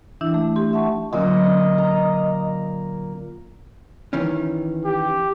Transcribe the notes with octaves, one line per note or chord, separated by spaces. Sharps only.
E3 D4 E4
A3
G4 C6
E5 F#5 A5 C#6
A#2 D3 F#3 C#4 D#5
A#5
D#3 E3 C#4
G4